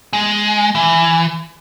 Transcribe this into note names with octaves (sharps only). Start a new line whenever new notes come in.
G#3
E3